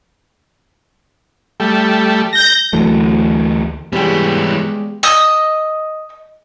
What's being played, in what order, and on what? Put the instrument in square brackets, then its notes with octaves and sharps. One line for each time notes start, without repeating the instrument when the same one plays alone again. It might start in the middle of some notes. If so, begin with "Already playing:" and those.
[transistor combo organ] G3 A3
[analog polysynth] G6 A#6
[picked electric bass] D2 E3 F#3 A3
[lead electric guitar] E3 G3 [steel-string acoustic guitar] G#3 D5 [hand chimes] B3 G4 G5
[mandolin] D#5 D#6 E6